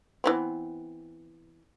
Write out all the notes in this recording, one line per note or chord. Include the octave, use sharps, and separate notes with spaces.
E3 B3 C4